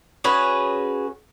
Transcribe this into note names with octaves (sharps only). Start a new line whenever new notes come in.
C#4 F#4 G#4 B4